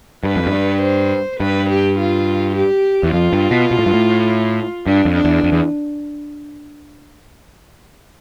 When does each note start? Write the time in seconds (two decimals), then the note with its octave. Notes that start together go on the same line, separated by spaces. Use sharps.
0.23 G2 B4
0.36 F2
0.47 G2
0.81 C5
1.40 G2 B4
1.69 G4
1.98 F4
2.56 G4
3.03 E2
3.13 F2 F4
3.33 G2
3.51 B2
3.71 B2
3.79 A2
3.86 G2
3.94 A2
4.86 G2 D4
5.05 F2
5.15 D4
5.25 E2
5.44 F2
5.52 E2